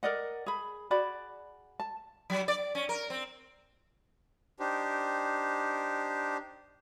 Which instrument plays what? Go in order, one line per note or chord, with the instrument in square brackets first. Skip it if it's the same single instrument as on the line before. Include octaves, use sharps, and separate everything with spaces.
[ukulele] A#4 D5 D#5 F#5
G#4 B5
F#4 G#4 D5 B5
A5
[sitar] F#3
D5
C#4
A#4
C4
[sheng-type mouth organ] D4 D#4 G4 C5